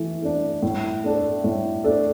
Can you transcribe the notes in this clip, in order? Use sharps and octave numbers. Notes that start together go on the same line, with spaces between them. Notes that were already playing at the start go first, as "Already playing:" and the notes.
Already playing: E3 A3
A3 D4
A2
A3 D4 A4
A2
A3 D4 A4